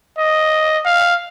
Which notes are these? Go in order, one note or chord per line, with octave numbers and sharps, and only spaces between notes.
D#5
F5